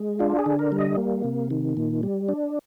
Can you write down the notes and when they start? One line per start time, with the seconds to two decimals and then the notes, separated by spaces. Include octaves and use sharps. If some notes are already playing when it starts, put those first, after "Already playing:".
Already playing: G#3
0.19 D4 F4
0.39 G#4
0.46 D3
0.59 A#4
0.72 G3
0.78 D#5
0.98 A#3
1.24 C3
1.50 D#3
1.77 A#2
2.03 G3
2.28 D4